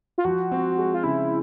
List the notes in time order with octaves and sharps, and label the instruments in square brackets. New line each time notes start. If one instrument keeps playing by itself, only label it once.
[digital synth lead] F4
[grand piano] F3 [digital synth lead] F#4
[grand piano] C4
G#3
[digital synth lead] F4
[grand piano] C#3 [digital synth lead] E4